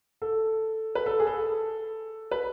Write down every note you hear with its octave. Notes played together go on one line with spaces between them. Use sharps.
A4
B4
A4
G#4
A4
B4